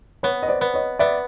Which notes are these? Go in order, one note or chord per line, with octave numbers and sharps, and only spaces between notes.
B3 B4 C#5
D#5
C5 D5
B3
C#5 D#5
B3 D5 E5